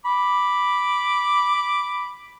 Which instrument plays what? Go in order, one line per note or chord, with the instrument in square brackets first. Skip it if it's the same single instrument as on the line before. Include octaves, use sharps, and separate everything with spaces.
[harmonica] B5 D6